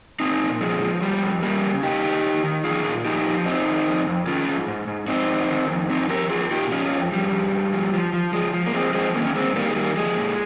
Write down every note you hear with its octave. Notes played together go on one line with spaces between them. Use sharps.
A#2 C4 D#4
A#2
F3 G#3
F3
F3 G3
F2
C#3 G3 A#3
C#3
G#2 D#4 G4
D#3
D#3
D#3
F3 F4 G#4
A#2
F3 D#4 G4
F3
F2 C4 D#4
D#3
F2
F2
D#3 C#4 F4
G#2
G#2
G#2
F2 C4 D#4
D#3
D#3
F2
F3 C4 D#4
F3 G4 A#4
F3 F4 G#4
A#2 D#4 G4
F3 C#4 F4
F2
F2 G3
F2
G#2
F3
F3
F3
F3 G#3
F3
A#3
F3 G#3 C4
F3 G#3 C4
D#3 A#3 C#4
C#4
G2 G#3 C4
D#3 G3 A#3
G#3
D#3 G3 A#3
F3 G#3
A#2